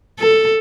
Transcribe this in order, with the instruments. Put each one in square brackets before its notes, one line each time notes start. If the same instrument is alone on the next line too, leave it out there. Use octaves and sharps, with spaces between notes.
[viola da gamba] A4